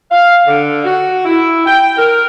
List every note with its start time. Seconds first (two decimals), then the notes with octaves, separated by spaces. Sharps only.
0.10 F5
0.46 D3
0.85 F#4
1.24 E4
1.66 G5
1.96 A#4